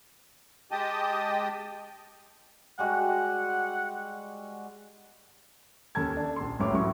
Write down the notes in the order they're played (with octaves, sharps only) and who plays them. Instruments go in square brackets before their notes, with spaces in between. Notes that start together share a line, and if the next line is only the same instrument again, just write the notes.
[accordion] G#3 G4 D#5 G5 A5 D#6
[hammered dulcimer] G3 G#3 F#4 [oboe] F#5
[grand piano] D#2 C#4 A4 A5 G#6
D4 A4
A#1 C6
A1 F#2 A2 C#5 D6
A1 A2 F#3 A3 C#6